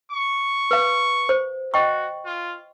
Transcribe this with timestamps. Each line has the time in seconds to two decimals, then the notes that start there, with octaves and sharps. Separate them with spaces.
0.12 C#6
0.71 B4 F5
1.29 C5
1.74 F#4 D#5 G5 C#6
2.26 F4